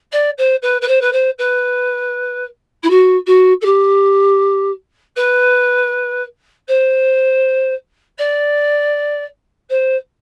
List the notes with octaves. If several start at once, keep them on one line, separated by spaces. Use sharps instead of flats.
D5
C5
B4
B4
C5
B4
C5
B4
E4
F#4
F#4
A4
G4
B4
C5
D5
C5